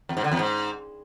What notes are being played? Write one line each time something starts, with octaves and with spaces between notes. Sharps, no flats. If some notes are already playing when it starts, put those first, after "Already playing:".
E2
G#2
D3
E2
G#2